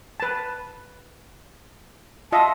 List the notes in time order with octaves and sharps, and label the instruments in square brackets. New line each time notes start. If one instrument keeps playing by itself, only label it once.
[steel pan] B4 A5
[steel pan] F4 D#5 E5 [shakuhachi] A5